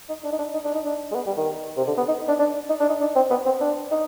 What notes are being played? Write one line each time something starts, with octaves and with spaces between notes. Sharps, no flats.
D#4
D4
D#4
D4
D#4
D4
D#4
D4
G#3
B3
G3
D#3
C3
D3
B3
D#4
D4
D4
D#4
D4
D#4
D4
C4
B3
C4
D4
D#4